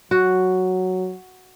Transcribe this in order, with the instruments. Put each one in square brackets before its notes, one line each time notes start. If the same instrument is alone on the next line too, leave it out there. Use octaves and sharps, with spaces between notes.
[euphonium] F#3 [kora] F#4